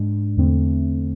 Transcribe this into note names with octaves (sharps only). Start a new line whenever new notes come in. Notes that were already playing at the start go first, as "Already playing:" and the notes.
Already playing: G#2 G#3 D4
E2 D3 A3 C4